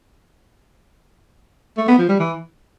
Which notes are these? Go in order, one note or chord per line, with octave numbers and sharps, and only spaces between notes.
A3
B3
F3
G3
E3